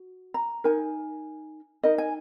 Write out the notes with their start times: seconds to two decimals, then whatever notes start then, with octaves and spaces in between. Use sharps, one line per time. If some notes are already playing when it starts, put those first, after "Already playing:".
Already playing: F#4
0.34 A#5
0.64 D#4 A#4 G#5
1.83 D#4 A#4 D#5
1.98 G#5